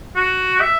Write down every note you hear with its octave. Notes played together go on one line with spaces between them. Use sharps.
F#4
E5